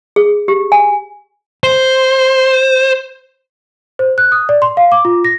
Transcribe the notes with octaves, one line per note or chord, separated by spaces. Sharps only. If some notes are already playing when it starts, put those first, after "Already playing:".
G#4
G4
G#5
C5
C5
F#6
D#6
D5
C6
F5
D6
F4
A#6